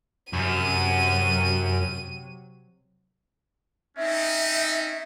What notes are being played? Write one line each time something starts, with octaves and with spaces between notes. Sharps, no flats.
F#2 C3 F#3 D#7
C4 C#4 D#4 E5